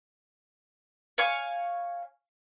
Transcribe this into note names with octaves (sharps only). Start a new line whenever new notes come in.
C#5 F5 G#5 C#6